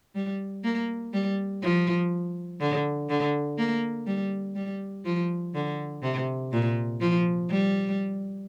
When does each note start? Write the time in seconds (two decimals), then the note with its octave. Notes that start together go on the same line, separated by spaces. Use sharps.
0.15 G3
0.64 A#3
1.13 G3
1.63 F3
2.60 D3
3.10 D3
3.58 A#3
4.07 G3
4.56 G3
5.05 F3
5.55 D3
6.03 C3
6.52 A#2
7.01 F3
7.50 G3